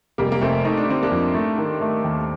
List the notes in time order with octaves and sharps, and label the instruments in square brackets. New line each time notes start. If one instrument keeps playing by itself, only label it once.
[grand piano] F1 [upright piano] G3 A#3
[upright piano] A#3
[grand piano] F1 [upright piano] A3 C4
[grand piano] A3 [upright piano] D#4
[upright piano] D4
[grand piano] D3 [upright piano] C4
[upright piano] A#3 D4
[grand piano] F2
A3
D#3
A3
D#2